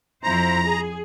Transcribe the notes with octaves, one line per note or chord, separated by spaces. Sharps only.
F2 E4 C5 A#5
G#4